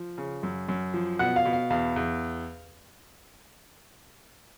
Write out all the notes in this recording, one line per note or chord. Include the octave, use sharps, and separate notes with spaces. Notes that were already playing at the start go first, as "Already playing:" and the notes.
Already playing: F3
C#3
F#2
F#2
F3
B2 F#5
F5
B2
F5
E2 F5
E2